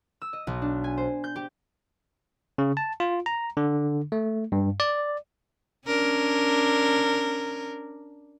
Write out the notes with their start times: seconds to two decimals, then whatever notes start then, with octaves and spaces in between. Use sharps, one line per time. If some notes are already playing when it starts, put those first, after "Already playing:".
0.22 E6
0.33 D#5
0.47 B1
0.62 D4
0.84 G#5
0.98 C5
1.24 G6
1.36 G4
2.58 C#3
2.77 A5
3.00 F4
3.26 A#5
3.57 D3
4.12 A3
4.52 G2
4.80 D5
5.87 C#4 D4 A#4